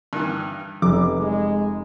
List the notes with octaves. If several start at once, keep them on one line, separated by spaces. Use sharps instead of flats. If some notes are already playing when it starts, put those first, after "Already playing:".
G2 D#3 E3
F1 E2 D6
G#3